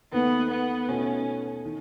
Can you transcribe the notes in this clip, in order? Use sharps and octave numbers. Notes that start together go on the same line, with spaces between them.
D#2 D#3 A3 B3
B3
B2 A3 C#4 D#4
D#3